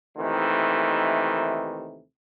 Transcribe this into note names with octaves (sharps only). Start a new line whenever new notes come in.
D#2 C3 D#3 E3 A3